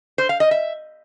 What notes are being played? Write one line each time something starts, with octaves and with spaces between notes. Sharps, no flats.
C5
F5
D#5
E5